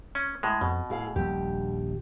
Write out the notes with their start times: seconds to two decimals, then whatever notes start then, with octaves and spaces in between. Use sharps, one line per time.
0.15 C#4
0.43 A2 G#3
0.61 F2 B2
0.90 A2 E4 G#4 F5
1.16 D#1 A#1 G3 G4